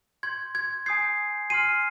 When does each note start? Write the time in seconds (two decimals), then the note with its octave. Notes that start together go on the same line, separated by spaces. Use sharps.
0.23 C6 G6 G#6
0.55 G#6
0.86 G#5 D#6 G6 G#6 C7
1.50 G#5 C6 F6 C7 D#7